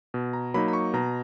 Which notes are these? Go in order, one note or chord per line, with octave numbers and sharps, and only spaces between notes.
B2
A#5
F#3 A#3 D#4 B5
B5
C#6
B2 A#5